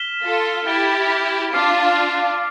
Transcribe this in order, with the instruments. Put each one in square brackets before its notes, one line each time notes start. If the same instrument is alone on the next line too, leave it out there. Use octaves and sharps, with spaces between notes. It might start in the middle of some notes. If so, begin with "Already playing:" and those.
Already playing: [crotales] F6 B6 E7 G7
[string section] F4 A4
[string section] E4 G4 [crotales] A6 D7 G7
[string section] D4 F4 [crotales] D6 F6 C7